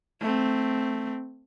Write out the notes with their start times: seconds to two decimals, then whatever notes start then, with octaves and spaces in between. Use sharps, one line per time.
0.20 A3 C4